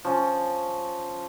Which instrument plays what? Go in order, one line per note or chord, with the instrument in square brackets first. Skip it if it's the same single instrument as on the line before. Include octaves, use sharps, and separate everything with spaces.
[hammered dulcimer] F3 C#4